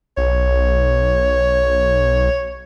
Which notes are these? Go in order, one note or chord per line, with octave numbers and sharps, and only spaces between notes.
B1 C#5